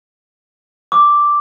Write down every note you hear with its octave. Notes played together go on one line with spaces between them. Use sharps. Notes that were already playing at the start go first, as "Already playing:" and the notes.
D6